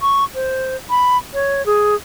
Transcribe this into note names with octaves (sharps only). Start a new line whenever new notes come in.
C#6
C5
B5
C#5
G#4